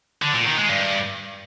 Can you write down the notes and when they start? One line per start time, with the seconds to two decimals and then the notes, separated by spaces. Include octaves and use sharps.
0.22 D3
0.34 A#2
0.46 D#3
0.57 G#3
0.69 G2